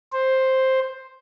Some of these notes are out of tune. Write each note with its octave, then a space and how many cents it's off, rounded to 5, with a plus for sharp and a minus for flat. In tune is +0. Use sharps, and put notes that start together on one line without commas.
C5 +5